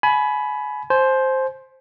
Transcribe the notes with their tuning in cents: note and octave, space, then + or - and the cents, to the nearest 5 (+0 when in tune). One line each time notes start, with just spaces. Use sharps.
G#5 +30 B5 +0
C5 +5 G#5 +45